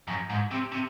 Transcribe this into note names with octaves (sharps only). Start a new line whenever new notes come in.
F#2
G#2
C3
C3